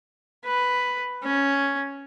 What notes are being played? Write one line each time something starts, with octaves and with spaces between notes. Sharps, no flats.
B4
C#4